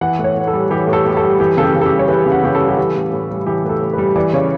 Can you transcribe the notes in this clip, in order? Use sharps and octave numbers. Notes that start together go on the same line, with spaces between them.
E3 F#5
A2
C#5
A2
A4
G3
E3 G4
A2
A4
A2 G4
A4
G3
E3 G4
C#3 A4
G4
C#3
A4
G4
G3
C#5
E3 B4
C#3
F#5
C#3 G4
A4
G3
G4
E3 A4
A2
A2
G3
E3 G4
A2 B4
A4
A2
G3 B4
E3 D5
C#3 C#5